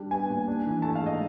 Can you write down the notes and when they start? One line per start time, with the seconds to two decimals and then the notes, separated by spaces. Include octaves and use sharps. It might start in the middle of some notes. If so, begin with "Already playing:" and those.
Already playing: G3 D4
0.11 B3 G#5
0.30 A#2
0.48 D4
0.66 E3
0.82 A3 A5
0.95 F5
1.01 G#2 D#5